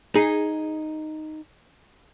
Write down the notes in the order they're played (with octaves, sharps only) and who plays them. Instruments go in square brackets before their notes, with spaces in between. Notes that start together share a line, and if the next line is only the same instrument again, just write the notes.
[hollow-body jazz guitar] D#4 [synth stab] G#4